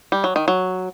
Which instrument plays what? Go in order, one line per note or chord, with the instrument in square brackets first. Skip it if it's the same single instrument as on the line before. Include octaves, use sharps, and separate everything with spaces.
[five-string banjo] G3
F#3
D#3
F#3